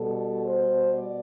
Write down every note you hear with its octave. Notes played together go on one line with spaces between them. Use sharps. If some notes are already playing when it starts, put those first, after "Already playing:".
Already playing: B2 G3 A4
C5
D5